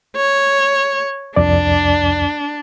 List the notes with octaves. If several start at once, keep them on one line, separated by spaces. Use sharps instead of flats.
C#5
C2 F2 D4 D5